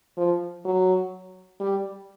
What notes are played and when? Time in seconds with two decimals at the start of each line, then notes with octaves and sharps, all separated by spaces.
0.17 F3
0.65 F#3
1.60 G3